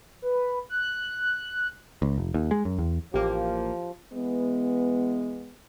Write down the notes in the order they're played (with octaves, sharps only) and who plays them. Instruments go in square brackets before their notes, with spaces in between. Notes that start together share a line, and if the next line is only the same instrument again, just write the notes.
[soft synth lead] B4
F#6
[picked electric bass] C#2
F1
D#2
G#3
F#2
E2
[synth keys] A1 A#3 [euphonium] F3 [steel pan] G4
[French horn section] E3 G#3 B3